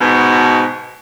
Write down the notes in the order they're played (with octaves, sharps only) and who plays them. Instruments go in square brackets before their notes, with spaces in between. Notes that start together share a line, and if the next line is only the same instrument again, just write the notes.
[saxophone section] G#2 B2